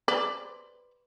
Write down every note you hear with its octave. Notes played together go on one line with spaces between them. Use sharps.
B4 C5 D5